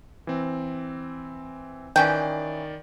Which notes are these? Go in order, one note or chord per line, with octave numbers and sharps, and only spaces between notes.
E3 C4
D#3 E3 C#4 D5 G5